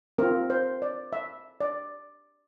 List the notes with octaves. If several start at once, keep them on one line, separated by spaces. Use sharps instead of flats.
C4 F4 A#4
C5
D5
E5
D5